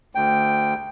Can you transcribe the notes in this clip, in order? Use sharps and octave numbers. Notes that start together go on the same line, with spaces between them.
D2 G5